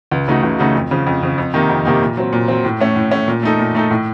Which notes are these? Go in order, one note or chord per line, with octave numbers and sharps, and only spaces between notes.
C#2
C#3 A3 D#4 F#4
C#2
C#3 A3 D#4 F#4
F2
C#3 F3
F2
C#3 F3
F2
C3 D#3 A#3 D#4
F2
C3 D#3 A#3 D#4
A#2
F#3 C4
A#2
F#3 C4
A2
A3 C#4
A2
A3 C#4
A#2
A3 D#4 A4
A#2
A3 D#4 A4
A2